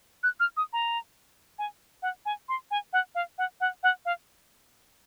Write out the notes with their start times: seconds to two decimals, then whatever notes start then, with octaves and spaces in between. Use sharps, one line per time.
0.23 F#6
0.40 F6
0.57 D#6
0.73 A#5
1.59 G#5
2.02 F#5
2.26 G#5
2.49 C6
2.71 G#5
2.93 F#5
3.15 F5
3.38 F#5
3.61 F#5
3.83 F#5
4.05 F5